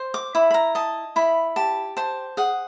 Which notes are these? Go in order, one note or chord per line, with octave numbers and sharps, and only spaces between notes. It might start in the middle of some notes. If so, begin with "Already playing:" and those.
Already playing: C5
D6
E4 B5
B5
A#5
D#5 A5
E4 B5
G4 A5
C5 A5
G#4 F#5